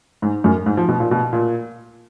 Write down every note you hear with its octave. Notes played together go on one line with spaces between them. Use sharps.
G#2
F#2
G#2
F3
B2
A#2
B2
A#2